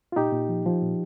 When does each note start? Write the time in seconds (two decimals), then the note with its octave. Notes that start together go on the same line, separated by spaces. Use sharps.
0.12 F4
0.16 A#2 D#4 G4
0.32 A#2
0.49 F3
0.66 F3
0.82 A#2